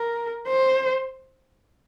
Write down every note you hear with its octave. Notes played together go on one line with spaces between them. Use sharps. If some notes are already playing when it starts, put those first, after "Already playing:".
Already playing: A#4
C5